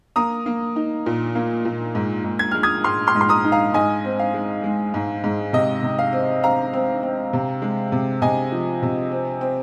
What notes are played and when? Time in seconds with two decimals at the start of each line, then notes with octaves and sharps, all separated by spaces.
0.16 A#3 A#5 D#6
0.46 A#3
0.76 D#4
1.06 A#2
1.35 A#3
1.65 A#2
1.95 G#2
2.24 G#2
2.39 G#6
2.51 G#3 F6
2.63 D#6 G#6
2.84 G#2 C6 F6
3.07 C6 F6
3.15 G#2
3.21 C6
3.29 A#5 D#6
3.45 D#4
3.52 F5 A#5
3.74 G#2 D#5 G#5
4.05 C4
4.19 F5
4.34 G#3
4.64 G#3
4.94 G#2
5.24 G#2
5.53 C3 D#5
5.83 C3
5.99 F5
6.13 C4
6.43 C4 F5 A#5
6.73 C4
7.03 C4
7.33 C3
7.62 G#3
7.92 C3
8.22 C3 D#5 G#5
8.52 F3
8.83 C3
9.12 C4
9.41 C4